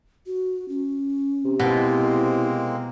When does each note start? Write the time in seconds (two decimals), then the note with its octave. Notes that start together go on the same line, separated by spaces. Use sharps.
0.27 F#4
0.69 C#4
1.45 C3
1.60 B2 G#3 A#3 C4 E4